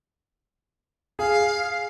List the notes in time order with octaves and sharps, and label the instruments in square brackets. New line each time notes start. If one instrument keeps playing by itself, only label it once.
[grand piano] G#4 [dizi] F5